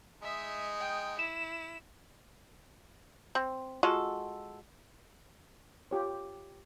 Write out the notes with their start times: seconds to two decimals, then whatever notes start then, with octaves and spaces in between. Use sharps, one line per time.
0.22 G#3 D#4 E5
0.80 G5
1.19 E4 E7
3.35 C4
3.83 G#3 F4 F#4 A4
5.91 F4 G4 C#5